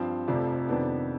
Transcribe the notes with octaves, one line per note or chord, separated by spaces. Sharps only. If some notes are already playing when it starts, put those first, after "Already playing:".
Already playing: G2 F3 C4
F1 F2 C3 F3 D5
F2 C3 D#3 B3 D4